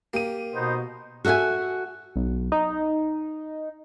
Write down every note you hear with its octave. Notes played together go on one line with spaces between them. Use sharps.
A#3 G4 D#7
B2 B3 D#4 C5
F#4 A4 D#5 E5 G#5
B1
D#4